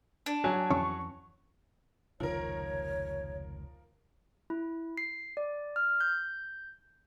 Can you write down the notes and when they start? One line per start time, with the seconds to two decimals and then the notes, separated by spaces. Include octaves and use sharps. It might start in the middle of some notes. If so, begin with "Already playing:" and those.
0.26 D4
0.44 F#3 G#5
0.70 F2 E3 C#4 C#6
2.20 F1 C#2 D#3 F3 A#4 C#5
4.50 E4
4.98 C7
5.37 D5
5.76 F6
6.01 G6